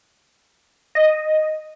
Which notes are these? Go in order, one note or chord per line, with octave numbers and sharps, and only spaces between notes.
D#5